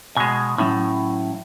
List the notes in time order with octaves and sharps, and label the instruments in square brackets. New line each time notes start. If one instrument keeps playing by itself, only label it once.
[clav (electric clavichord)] B2 G#3 [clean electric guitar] G#5
[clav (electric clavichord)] A2 [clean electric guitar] F#3 C#4 E4